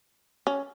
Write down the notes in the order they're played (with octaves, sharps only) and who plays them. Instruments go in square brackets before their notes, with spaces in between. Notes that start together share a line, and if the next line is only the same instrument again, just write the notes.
[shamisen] C#4